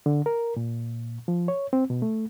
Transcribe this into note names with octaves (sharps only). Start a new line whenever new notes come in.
D3
A#4
A#2
F3
C#5
C4
B2
A3